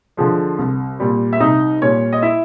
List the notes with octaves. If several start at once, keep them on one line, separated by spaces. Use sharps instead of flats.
D3 F3 G#3
C2
A#2 G3
E5
C2 D#4 D#5
A#2 G3 C#4 C#5
D#5
E4 E5